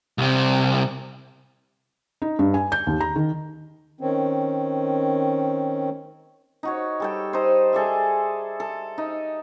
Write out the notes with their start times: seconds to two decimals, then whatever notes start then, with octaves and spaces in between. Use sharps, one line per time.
0.18 C2 C3
2.22 D#4
2.39 G2
2.54 G#5
2.72 G6
2.87 D#2
3.00 A#5
3.16 D#3
4.01 D#3 C4 C#4
6.63 D#4 F#4 C#5
7.00 G3 A4 G5
7.33 D#4 C5
7.73 G#4 A4 D5 E5
8.60 A4
8.98 D#4